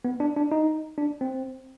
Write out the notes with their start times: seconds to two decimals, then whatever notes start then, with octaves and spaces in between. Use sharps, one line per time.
0.05 B3
0.20 D4
0.36 D4
0.52 D#4
0.98 D4
1.21 C4